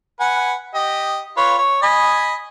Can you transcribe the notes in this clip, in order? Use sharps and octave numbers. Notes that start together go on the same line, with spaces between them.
B4 F#5 G#5
G4 D#5
F4 B4 C#5
C#5
D#5 G#5 B5